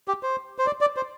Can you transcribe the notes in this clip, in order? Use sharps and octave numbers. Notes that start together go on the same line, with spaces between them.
G4
C5
C5
D5
D5
C5